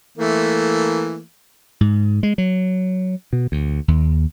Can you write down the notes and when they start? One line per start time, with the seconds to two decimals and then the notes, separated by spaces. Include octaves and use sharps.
0.18 E3 A3 A#3
1.81 G#2
2.23 G#3
2.38 F#3
3.33 B2
3.52 D2
3.88 D#2